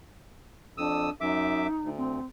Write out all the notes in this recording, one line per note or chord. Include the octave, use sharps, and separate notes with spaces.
F2 D4 D#6 E6
F#2 D#4 E5 D6
D2
C4